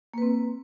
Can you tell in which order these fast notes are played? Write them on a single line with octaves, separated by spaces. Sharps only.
A#3 B4 C4